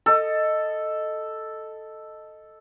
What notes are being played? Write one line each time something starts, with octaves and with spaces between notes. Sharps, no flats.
A4 D#5